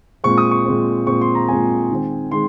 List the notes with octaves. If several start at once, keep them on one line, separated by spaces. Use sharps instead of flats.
A#2 G#3 C4 C#6
D#6
C#6
A#2 G#3 C4
A#2 G#3 C4 C#6
C6
A#5
A#2 G#3 C4 G#5
D#3 G#3 C4
D#3 G#3 C6